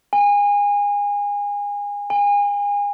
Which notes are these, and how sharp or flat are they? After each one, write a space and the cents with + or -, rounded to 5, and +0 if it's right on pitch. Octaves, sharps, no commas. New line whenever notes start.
G#5 -30
G#5 -35